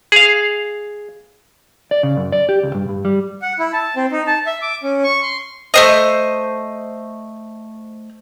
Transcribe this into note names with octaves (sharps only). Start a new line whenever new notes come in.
G#4 F5
D5
C#3
F#2
D5
G4
C#2
G2
G2
G3
F#5
E4
A5
C4
D#4
A5
E5
D6
C#4
C#6
C6
A3 C5 D#5